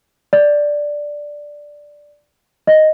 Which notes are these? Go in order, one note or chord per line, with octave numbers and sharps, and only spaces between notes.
D5
D#5